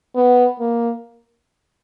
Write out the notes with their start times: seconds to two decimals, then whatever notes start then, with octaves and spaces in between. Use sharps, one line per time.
0.16 B3
0.60 A#3